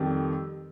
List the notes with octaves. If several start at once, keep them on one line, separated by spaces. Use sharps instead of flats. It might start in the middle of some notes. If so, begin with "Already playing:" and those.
Already playing: F2 D#3 G3